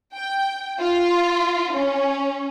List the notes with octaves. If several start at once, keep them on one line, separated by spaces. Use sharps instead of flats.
G5
F4
C#4